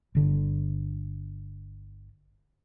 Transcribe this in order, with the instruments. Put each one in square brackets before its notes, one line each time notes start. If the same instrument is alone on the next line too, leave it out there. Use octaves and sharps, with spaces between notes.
[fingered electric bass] G1 D3